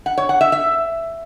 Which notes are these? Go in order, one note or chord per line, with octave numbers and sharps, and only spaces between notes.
F#5
C#5
F#5
E5
E5